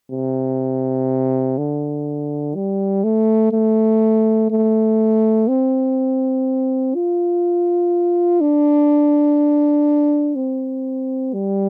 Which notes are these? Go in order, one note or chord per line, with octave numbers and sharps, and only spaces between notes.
C3
D3
G3
A3
A3
A3
C4
F4
D4
C4
G3